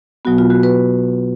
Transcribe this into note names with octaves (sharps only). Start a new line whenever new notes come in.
B2 F#3 B3 F#4
F4
F#4
B4